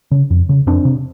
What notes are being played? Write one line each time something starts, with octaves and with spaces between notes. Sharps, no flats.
C#3
F2
C#3
F2 C4 D4
C3